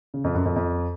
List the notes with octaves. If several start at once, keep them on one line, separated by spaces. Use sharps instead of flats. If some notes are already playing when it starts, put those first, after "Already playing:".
C#3
F2
F#2
F2
F2